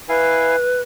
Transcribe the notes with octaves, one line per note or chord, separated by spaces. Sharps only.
E4 B4 F5 G#5